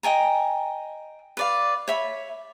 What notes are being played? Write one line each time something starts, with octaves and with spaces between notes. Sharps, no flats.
D#5 G5 G#5 A#5
B4 D5 F5
C#5 E5 B5